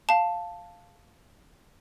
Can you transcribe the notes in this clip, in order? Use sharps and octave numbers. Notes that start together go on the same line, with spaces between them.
F5 A5